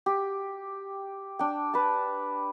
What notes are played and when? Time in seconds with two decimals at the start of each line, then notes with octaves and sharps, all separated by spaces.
0.06 G4
1.39 D4 G5
1.74 B4 A5